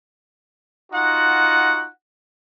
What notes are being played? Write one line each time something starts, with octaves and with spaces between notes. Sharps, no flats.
D#4 F4 F#4 F#5